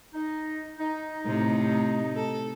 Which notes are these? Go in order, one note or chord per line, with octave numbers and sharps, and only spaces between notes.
D#4
D#4
A2 C3
A4